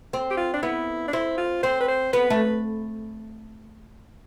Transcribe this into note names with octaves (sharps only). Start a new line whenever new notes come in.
C4
G4
F4
D4
B3 E4
D4
C4 E4
F4
C4 C5
B4
C5
B3 B4
A3